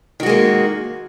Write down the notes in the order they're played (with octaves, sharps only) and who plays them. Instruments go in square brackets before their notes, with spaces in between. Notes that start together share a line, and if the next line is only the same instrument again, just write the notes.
[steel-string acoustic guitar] D#3
F#4
G#3
A#3